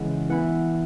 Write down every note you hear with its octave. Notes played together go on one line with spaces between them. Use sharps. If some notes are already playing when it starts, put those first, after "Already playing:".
Already playing: C#3 E3 G#3 C#4 E4 F#5
E3 B3 E4 F#5